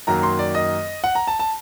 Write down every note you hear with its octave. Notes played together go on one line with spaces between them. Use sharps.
F#2 D#3 F#3 A#3 A#5
C6
D5
D#5
F#5
A#5
A5
A5